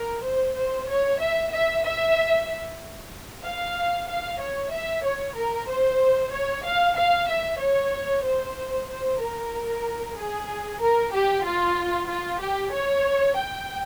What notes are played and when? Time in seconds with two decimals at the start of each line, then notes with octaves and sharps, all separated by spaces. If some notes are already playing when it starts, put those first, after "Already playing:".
Already playing: A#4
0.24 C5
0.57 C5
0.89 C#5
1.21 E5
1.52 E5
1.84 E5
3.44 F5
4.09 F5
4.41 C#5
4.72 E5
5.04 C#5
5.36 A#4
5.69 C5
6.33 C#5
6.65 F5
6.97 F5
7.29 E5
7.61 C#5
8.25 C5
8.89 C5
9.20 A#4
10.17 G#4
10.81 A#4
11.13 G4
11.44 F4
12.09 F4
12.41 G4
12.73 C#5
13.37 G5